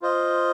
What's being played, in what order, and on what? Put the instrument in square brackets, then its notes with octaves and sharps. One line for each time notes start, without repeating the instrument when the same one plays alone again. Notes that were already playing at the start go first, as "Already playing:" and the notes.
[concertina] F4 C5 D#5